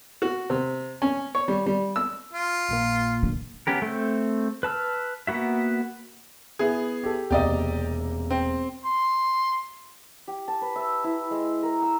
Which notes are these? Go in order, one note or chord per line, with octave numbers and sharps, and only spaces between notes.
F#4
C3
C#4
C#5
G3
G3
E6
F4
A#1 A#2 A#3
D3
B3 C#4 G4 A#4
A3 C4
B4 A5 E6 F6
A#3 B3 F#4 E5
B3 E4 G#4
G4 A4
E1 C3 A#3 G4 D5 D#5
C4
C6
G4
A5
B4
E5
E4
G#3
A#4
E6